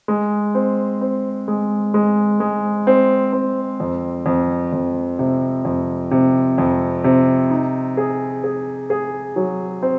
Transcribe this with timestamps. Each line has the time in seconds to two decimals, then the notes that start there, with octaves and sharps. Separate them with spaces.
0.08 G#3
0.55 C4
1.01 C4
1.48 G#3
1.94 G#3
2.40 G#3
2.87 C4
3.33 C4
3.80 F2
4.26 F2
4.73 F2
5.19 C3
5.65 F2
6.11 C3
6.58 F2
7.04 C3
7.51 D#4
7.97 G#4
8.44 G#4
8.90 G#4
9.36 F#3
9.82 C4